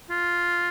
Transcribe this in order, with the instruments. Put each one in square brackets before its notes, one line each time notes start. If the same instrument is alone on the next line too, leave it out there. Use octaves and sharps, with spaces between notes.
[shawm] F4